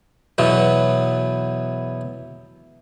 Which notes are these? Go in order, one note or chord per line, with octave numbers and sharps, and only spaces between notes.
E2 B2 F#3